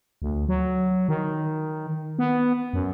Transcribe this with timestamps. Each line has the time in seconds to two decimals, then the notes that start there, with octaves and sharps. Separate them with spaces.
0.22 D2
0.48 F#3
1.08 D#3
2.19 B3
2.74 F#2